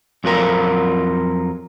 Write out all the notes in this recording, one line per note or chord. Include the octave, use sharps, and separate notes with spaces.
F2 F#3 F4 A#4